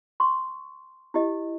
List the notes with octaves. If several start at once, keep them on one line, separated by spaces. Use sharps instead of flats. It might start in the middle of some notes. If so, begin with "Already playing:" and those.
C6 C#6
E4 G4 D#5